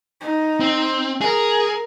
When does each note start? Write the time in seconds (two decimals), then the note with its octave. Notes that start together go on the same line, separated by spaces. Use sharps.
0.21 D#4
0.60 C4
1.21 G#4 A#4